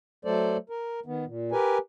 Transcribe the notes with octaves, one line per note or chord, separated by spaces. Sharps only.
F#3 A3 A4 C5 D5
A#4
D#3 B3
A#2
G4 A#4 B4 G#5